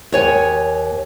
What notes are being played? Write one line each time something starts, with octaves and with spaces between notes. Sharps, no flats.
D#2 C#5 G#5